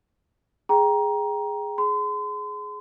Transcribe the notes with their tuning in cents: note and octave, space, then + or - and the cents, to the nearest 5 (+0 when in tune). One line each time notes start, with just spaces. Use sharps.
G#4 +0 G5 +0 A#5 +15
G#4 +15 C6 -40